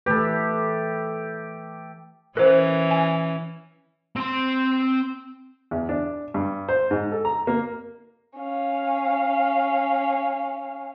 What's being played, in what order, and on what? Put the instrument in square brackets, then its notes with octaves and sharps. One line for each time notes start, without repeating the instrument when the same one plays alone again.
[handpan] E3 A3 B4 [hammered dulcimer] G4 A4
[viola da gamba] E3 C#4 [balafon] A#4 C5
[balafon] G#5
[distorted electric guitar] C4 C6
[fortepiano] E2
D4
G2
C5
G#2
A4
A#5
A#3
[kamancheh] C#4 F5